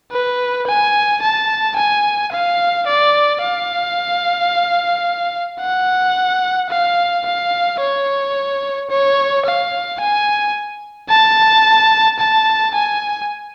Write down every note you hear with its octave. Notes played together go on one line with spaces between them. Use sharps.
B4
G#5
A5
G#5
F5
D5
F5
F#5
F5
F5
C#5
C#5
F5
G#5
A5
A5
G#5